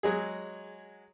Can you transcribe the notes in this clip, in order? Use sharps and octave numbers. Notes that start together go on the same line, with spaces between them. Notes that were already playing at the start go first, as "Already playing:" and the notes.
F#3 G#3 G#4